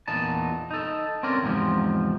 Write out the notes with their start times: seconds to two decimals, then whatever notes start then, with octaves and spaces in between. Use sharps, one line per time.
0.08 E2 A#2 D#4 A5
0.71 D#4 A4
1.23 C4 C#4 A#4 D5
1.43 E2 G#2 C3 F3